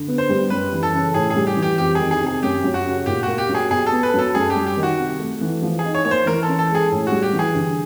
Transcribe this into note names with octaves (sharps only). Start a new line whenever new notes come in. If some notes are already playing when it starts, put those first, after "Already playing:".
Already playing: D3
B3
C5
G3
F#2 B4
E3
A4
C#3
A2 G#4
G3 G#4
G4
E3
G4
F2 G4
D#3 G#4
G#4
C3 G#4
F#2 G4
F#3
F#4
C#3
A#2 G4
A#3 F#4
G4
F#3
G#4
B2 G#4
A4
B3
B4
F#3 A4
F#2 G#4
G4
G3
G4
D#3
F#4
C3
A3
E3
F3
G#4
D#4
C#5
A#3 C#5
C5
E3 A#4
A4
C#4
A4
G#3
G#4
A2
G3 F#4
G4
E3
G#4
D3